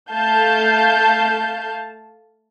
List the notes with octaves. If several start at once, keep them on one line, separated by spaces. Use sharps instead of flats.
A3 F5 A5 G6